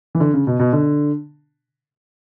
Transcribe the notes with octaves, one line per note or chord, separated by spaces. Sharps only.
E3
D3
C#3
B2
B2
D3